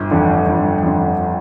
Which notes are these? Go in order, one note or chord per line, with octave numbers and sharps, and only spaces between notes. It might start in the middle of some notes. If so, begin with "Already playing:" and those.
Already playing: G1
F2 D3
G1
F2 D3